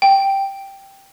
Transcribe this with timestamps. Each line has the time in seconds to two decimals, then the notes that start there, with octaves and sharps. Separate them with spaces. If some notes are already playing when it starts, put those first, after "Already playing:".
0.02 G5